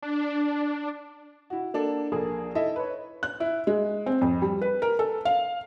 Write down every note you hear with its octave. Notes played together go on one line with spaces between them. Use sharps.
D4
E4 F#4
A#3 D4 A4
A#1 A#3 G#4 A4
D#4 E4 A4 D#5 E5
B4 C#5
F#6
E4
G#3
C4
F2
G3
B4
A#4
A4
F5